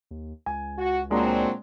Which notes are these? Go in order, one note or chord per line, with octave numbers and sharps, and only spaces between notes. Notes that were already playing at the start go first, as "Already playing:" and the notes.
D#2
C#2 G#5
F#4
A#2 F#3 G#3 C4 D4 A#5